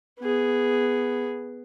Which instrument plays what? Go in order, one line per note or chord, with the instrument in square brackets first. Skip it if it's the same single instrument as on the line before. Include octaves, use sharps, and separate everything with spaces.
[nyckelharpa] B3 G#4